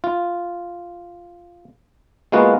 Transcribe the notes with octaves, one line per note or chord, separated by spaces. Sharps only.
F4
G#3 A#3 B3 F4 F#4